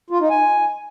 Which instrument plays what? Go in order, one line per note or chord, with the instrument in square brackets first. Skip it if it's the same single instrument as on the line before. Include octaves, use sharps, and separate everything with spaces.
[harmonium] F4
D#4
G#5